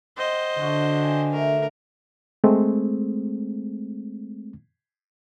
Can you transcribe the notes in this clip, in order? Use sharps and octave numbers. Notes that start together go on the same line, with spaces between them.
C5 D#5 F#5 G5
D3 F#4 F#5 A5
G5 G#5
A3 A#4
G#3 A3 C4